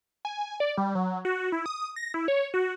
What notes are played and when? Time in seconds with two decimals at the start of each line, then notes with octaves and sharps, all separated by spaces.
0.25 G#5
0.60 D5
0.78 G3
0.95 F#3
1.25 F#4
1.52 E4
1.66 D#6
1.96 A#6
2.14 E4
2.28 C#5
2.54 F#4